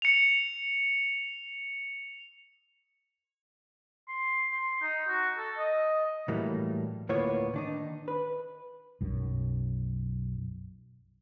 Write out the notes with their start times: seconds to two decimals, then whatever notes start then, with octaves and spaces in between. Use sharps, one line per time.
0.02 C#7 F7
4.08 C6
4.52 C6
4.82 D#4
5.08 F#4
5.38 A4
5.58 D#5
6.28 A2 E3 F#3 G3 A3 A#3
7.09 D2 A2 A#3 B3 F4 C#5
7.54 D#3 D4 D#4
8.08 B4
9.01 B1 F#2